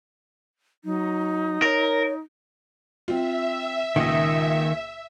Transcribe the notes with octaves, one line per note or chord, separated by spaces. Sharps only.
F#3 D#4
A#4 C#5
C4 F4 E5
C#2 A#2 D#3 D#5